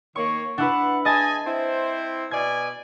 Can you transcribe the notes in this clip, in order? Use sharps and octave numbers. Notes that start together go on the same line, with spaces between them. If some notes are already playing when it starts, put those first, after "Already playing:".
D#3 A#3 C#5 C#6
D4 E4 B4 F#5
G#4 D#5 G#5 A5 A6
C4 E4 C5
B2 D5 G#5 G#6